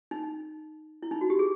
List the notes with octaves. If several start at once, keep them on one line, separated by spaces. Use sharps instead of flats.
D#4
E4
D#4
F#4
G4
G#4